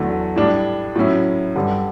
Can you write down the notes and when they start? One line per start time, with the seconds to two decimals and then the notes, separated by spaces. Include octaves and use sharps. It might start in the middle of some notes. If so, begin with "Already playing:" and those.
Already playing: E2 D3 F#3 A3
0.36 A2 G3 D4
0.96 A2 F#3 C#4 E4
1.56 G2 D3 G3